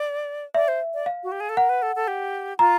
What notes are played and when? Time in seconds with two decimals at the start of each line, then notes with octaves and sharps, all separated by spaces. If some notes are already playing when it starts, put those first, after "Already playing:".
Already playing: D5
0.55 D5 E5
0.68 C5
0.94 D5
1.06 F5
1.23 F#4
1.32 G4
1.40 G#4
1.49 A4
1.57 A#4 F#5
1.69 B4
1.82 A4
1.96 A4
2.08 G4
2.59 F4 A#5